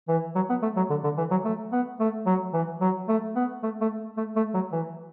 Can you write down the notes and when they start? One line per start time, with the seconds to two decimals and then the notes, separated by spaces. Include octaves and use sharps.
0.08 E3
0.35 F#3
0.49 B3
0.62 A3
0.76 F#3
0.90 D3
1.04 D3
1.17 E3
1.31 F#3
1.44 A3
1.72 B3
2.00 A3
2.26 F#3
2.53 E3
2.81 F#3
3.08 A3
3.35 B3
3.63 A3
3.81 A3
4.17 A3
4.36 A3
4.54 F#3
4.72 E3